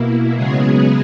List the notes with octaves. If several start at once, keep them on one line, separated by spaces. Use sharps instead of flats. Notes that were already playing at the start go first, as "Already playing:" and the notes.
Already playing: B2 A#3 E4
C#3 F#3 G#3 B3 G#4